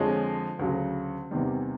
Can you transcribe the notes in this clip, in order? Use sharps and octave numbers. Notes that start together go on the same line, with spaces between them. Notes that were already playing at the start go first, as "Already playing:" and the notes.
Already playing: F2 D3 F3 G#3 C#5 D#5
D2 C#3 F#3
E2 C3 D#3 G3